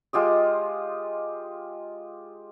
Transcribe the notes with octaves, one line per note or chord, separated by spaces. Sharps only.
G#3 F4 G4 D#5